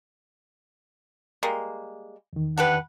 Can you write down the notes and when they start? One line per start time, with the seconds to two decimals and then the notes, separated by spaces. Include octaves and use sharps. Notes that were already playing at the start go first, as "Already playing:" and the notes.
1.43 G3 G#3 A#3
2.33 E2 D#3
2.58 D4 G4 B4 F#5